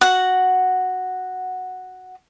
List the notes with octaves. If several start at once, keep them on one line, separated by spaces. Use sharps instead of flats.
F#4 F#5